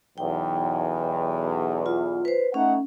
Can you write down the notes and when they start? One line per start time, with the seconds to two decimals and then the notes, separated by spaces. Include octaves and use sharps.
0.18 B1 E2 G5
1.86 F4
2.25 B4 C5
2.54 A3 C#4 D#4 F#5